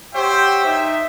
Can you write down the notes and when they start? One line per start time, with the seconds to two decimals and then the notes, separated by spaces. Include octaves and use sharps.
0.14 G4 C5 C#5 E5 F#5 G5
0.65 D#4 E5